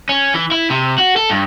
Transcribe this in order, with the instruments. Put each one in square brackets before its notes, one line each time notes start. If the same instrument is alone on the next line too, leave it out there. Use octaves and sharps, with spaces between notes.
[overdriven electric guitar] C#4
E3
E4
C3
F#4
A4
G2